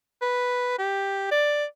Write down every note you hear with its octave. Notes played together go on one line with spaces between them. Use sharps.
B4
G4
D5